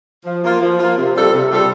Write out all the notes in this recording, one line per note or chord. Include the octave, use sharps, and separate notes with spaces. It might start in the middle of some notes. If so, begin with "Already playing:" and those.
F3
A#3 F4
F3
A#3 F4
C3
G3 D4 F4 A4
C3
G3 D4 F4 A4